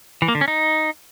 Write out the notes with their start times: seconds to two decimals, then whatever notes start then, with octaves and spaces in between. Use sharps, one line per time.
0.22 E3
0.28 A#3
0.35 D3
0.41 C#4
0.48 D#4